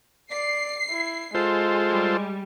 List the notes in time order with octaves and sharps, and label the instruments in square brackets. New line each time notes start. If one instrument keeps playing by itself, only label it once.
[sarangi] D5 [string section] C7
[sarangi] E4
[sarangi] G#3 [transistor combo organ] F4 A4 C5
[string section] G3